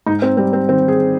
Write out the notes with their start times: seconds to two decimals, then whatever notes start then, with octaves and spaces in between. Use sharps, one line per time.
0.06 G#2 D#4
0.22 C4
0.37 G3 C4
0.53 C4
0.68 D#3 C4
0.88 G#4